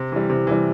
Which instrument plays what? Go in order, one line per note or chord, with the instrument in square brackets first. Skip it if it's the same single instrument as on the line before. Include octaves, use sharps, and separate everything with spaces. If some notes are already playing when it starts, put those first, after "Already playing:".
Already playing: [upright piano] C3
E3 G3
C3
E3 G3